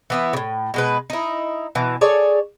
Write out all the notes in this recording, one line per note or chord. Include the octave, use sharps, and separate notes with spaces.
E3 B3 E4
A2 C#3
B2 G#3 B4
D#4 E4
B2 E3
G#4 A4 C#5 D5